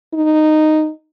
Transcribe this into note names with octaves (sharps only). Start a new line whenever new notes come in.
D#4